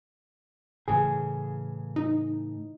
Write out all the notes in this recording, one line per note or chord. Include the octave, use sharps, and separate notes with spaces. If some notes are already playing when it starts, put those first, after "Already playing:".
A2 C#3 E3 G#4
D#4